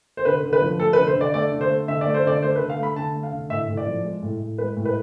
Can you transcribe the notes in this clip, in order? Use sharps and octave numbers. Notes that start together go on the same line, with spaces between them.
C5
D3 B4
D3
B4
F3
A3 A4
B4
D3
C5
D3 D5
A3 D5
D3
C5
A3
D3 E5
D5
A3
C5
D3 D5
A3 C5
B4
D3
F5
A3 B5
D3 A5
A3
F5
D3
A2 E5
A2
D5
F3
G#3
A2
A2
G#3 B4
A2
B4